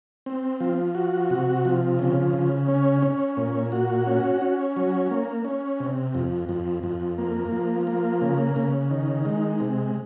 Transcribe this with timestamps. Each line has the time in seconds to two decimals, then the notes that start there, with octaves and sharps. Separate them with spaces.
0.26 C4
0.60 F3
0.95 F#4
1.30 C3
1.65 F3
1.99 C#3
2.33 C#3
2.68 C#4
3.02 C#4
3.37 A#2
3.72 F#4
4.07 C#4
4.41 C#4
4.76 F#3
5.11 A#3
5.45 C#4
5.80 C3
6.15 F2
6.49 F2
6.83 F2
7.18 A#3
7.52 F3
7.87 A#3
8.21 C#3
8.56 C#3
8.91 D#3
9.25 G#3
9.60 C3